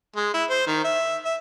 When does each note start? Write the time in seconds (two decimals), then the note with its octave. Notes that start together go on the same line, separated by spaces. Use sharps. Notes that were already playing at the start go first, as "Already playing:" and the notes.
0.16 G#3
0.34 E4
0.50 C5
0.67 D#3
0.84 E5
1.25 E5